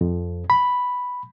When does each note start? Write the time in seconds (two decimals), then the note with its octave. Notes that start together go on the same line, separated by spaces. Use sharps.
0.01 F2
0.50 B5